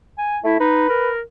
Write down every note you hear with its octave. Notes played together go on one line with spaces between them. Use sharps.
G#5
A3 E4
D#4 B4
A#4